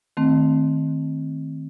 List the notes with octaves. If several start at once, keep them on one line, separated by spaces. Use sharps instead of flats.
D#3 A3 C4